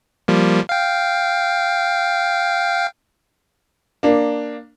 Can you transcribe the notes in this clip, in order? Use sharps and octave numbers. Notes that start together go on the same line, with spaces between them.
F3 G3 A#3
F5 G5
A#3 D4